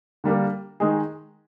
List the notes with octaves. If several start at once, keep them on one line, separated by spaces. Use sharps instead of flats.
D3 G3 A#3 D4
D#3 G#3 D#4 G#4